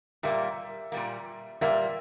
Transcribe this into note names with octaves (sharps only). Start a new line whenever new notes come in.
A#2 G3 A#3 E5
A#2 G3 A#3
A#2 G3 A#3 E5